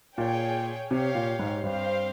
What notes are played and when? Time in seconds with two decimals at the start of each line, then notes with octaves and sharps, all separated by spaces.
0.18 A#2 G#4 C#5 G5
0.91 C3 G4 C#5 F5
1.15 A#2
1.39 G#2
1.63 G2 C4 G4 C5 F5